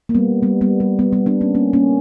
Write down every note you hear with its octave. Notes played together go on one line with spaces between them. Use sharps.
A#3
G3 B3
G3 B3
G3 B3
G3
G3 B3
G3 B3
B3 D4
A#3 C#4
A#3 C#4
A#3 C#4